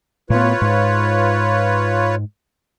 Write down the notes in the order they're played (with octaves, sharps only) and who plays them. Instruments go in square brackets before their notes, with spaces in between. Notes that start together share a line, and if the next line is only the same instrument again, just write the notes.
[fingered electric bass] A2 B3 [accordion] F4 B4 C#5
[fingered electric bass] G#2